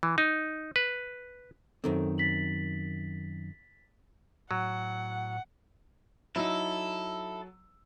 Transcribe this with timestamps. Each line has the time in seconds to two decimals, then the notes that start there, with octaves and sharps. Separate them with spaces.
0.03 E3
0.18 D#4
0.76 B4
1.84 F#2 D#3 C4 A4
2.18 A6 B6 F#7
4.51 A2 F#3 F#5
6.36 F#3 D#4 E4 A4 E6